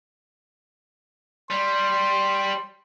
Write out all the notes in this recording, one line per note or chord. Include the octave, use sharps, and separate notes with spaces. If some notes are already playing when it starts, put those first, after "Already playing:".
G3 C6